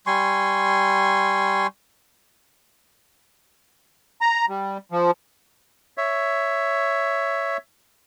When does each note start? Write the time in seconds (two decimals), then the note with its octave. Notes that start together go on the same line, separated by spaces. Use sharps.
0.07 G3 G#5 C6 C#6
4.21 A#5
4.49 G3
4.92 F3
5.97 C#5 E5